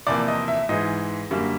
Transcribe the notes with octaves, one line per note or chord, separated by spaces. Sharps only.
E2 C3 F3 A#3 D5
D#5
E5
G#2 E3 G#3 D#5
F#2 D3 G3 A#3